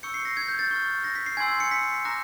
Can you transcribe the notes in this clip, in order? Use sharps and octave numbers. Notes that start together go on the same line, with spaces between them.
C#6 E6 G6 C#7
C7
A#6
G#6
G6
A6
C#6 F6
A#6
B6
C7
G#5 C6 E6 G#6
G#6
C#7
B6
A#5 D6 F#6 A#6